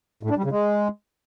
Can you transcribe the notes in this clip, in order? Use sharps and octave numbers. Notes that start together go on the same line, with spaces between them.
A2
D4
G3
C#3
G#3